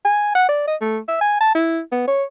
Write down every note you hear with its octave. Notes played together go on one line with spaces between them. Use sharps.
G#5
F#5
D5
D#5
A3
E5
G#5
A5
E4
B3
C#5